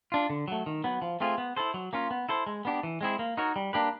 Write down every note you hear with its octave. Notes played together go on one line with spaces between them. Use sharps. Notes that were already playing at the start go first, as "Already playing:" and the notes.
D4 F4
D3
F#3 A3
D#3
F#3 B3
F3
A3 C4 F4 G#4
B3
E4 A4 C5
F#3
A#3 C#4 F4
B3
E4 A4 C5
G#3
B3 D4 G4
E3
G#3 C4 E4 G#4
A#3
D#4 F#4 A#4 C#5
G3
A#3 D4 G4 B4